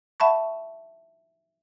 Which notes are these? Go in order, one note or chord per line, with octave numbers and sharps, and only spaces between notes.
E5 F#5 A5 B5 C#6